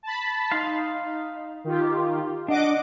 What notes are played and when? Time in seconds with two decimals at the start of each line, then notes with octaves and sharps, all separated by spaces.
0.03 A5 B5
0.51 D#4 F5 C6
1.64 D#3 F4 G4
2.48 D4 D#5 F#5 D6